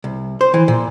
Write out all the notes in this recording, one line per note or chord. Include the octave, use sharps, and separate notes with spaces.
C2
C5
E3
A#2